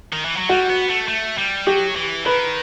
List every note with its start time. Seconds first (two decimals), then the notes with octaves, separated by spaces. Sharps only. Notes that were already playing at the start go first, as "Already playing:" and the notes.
0.13 D#3
0.25 E3
0.37 F#3
0.49 G3 F#4
0.70 B3
0.90 A3
1.08 A3
1.38 G3
1.67 F#3 G4
1.96 E3
2.26 D#3 B4